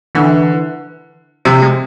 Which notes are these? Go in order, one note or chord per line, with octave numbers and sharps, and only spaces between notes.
D3 E3
C3 F3
G#3